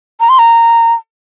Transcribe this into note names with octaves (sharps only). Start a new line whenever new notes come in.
A#5
C6
A#5